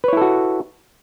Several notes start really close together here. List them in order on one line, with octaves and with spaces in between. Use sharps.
B4 C#5 E4 A4 F#4